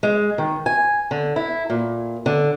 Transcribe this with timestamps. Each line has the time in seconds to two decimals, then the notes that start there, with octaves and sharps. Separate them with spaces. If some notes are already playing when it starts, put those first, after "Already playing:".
0.03 G#3
0.38 D#3
0.66 G#5
1.11 D3
1.36 E4
1.70 A#2
2.26 D3